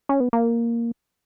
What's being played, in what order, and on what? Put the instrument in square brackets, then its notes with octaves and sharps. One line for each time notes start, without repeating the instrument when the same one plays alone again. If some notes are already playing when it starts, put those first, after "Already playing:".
[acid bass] C#4
B3
A#3